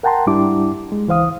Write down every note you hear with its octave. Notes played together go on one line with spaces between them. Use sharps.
A#4 F#5 G5 A5 A#5 C6
G#2 G3 D4 E4 G4 D6
G#3
C#2 E3 C5 F5 D#6